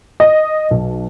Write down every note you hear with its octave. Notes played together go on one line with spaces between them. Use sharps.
D#5
B1